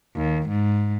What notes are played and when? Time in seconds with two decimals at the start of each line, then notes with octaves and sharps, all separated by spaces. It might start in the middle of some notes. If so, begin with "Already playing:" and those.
0.16 D#2
0.48 G#2